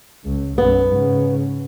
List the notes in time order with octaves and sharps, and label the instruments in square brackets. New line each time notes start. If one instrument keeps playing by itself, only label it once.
[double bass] C#2
[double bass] B1 F#2 [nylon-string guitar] B3
[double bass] G#2 C#3